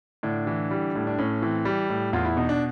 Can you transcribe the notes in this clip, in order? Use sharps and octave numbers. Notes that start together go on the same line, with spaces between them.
A2 D3 D4
E3
G3
A2
D4
A2 C#4
E3 C4
G3
A2
E2 F4
E4
B2 D#4
D4